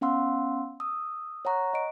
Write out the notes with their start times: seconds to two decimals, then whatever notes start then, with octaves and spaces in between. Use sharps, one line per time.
0.01 B3 C#4 F5 F#5 C6 E6
0.80 D#6 E6
1.45 C#5 F#5 A#5 C#6 F#6
1.73 D#5 D7